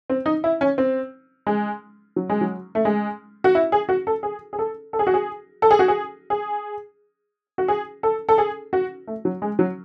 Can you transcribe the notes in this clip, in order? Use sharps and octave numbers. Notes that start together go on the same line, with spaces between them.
C4
D#4
E4
C#4
C4
G#3
F#3
G#3
F#3
A3
G#3
F#4
E4
G#4
F#4
A4
G#4
G#4
A4
A4
G#4
F#4
G#4
A4
G#4
F#4
G#4
G#4
F#4
G#4
A4
A4
G#4
F#4
A3
F#3
G#3
F#3